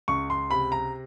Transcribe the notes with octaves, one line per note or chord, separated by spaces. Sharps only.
C#2 C#6
C6
C3 B5
A#5